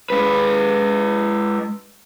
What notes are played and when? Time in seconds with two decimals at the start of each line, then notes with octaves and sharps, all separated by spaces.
0.10 G#3 B4